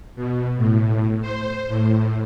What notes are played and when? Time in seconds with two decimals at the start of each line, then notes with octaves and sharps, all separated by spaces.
0.16 B2
0.57 A2
1.22 C5
1.68 A2